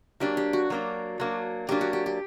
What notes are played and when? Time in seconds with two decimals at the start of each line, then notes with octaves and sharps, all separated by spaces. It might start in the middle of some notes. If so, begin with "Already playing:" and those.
0.20 F#3 A#3 D4 G4
0.37 G4
0.53 F#4
0.70 F#3 A#3 D4
1.20 F#3 A#3 D4
1.69 F#3 A#3 D4 G4
1.81 F#4
1.93 G4
2.06 G4